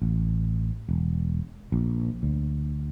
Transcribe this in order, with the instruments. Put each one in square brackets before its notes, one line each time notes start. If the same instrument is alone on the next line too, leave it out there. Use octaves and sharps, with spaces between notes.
[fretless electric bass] A1
E1
A#1
D2